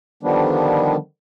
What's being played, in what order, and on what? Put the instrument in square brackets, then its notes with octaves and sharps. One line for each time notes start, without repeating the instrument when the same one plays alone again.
[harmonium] D3 D#3 F3 G3 B3 D4